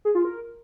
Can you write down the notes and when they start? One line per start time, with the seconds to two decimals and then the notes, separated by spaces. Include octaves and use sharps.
0.05 G#4
0.15 F4
0.25 A#4